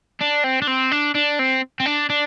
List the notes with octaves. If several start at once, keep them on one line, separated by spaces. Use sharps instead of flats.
D4
C4
D4
C4
D4
D4
C4
C4
D4
D4